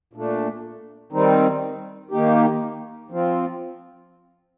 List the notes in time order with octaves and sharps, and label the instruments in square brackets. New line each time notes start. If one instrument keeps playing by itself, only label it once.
[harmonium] A#2 A3 D4
D#3 G3 C4 D#4
D#3 A#3 D#4 G4
F3 C4 F4